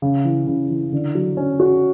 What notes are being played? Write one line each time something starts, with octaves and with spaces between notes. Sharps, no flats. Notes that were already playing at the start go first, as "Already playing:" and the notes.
C#3
E3
C#3
E3
D3
F#3
C#4
F#4